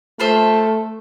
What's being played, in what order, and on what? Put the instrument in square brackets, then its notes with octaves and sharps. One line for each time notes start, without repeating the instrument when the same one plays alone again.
[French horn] A3 [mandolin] F4 A4 C5 E5